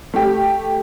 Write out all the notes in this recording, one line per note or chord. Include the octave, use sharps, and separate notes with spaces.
A3 G4